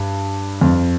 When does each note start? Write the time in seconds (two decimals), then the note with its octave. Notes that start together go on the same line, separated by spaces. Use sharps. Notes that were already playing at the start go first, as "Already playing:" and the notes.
Already playing: G2
0.61 F2